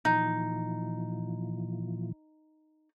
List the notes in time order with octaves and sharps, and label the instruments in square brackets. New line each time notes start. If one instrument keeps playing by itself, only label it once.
[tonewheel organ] A#2 E3 F3 [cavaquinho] D#4